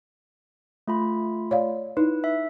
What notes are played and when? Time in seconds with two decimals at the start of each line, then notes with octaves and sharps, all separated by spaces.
0.87 A3 F4 B5
1.51 C#5 D5 F5
1.97 D#4 E4 B4
2.24 E5